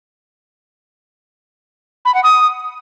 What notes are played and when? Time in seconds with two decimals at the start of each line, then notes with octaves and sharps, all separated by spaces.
2.05 B5
2.14 F#5
2.24 D#6